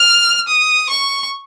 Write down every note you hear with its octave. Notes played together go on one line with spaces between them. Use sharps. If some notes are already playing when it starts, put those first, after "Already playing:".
Already playing: F6
D#6
C#6